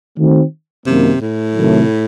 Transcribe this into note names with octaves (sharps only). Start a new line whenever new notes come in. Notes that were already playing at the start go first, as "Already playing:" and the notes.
D#3 A3 C4 F#4
F#2 C3 D#3 A#3
A2
C3 D#3 F#3 A3